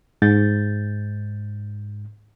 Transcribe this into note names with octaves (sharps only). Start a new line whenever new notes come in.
G#2 G6 A6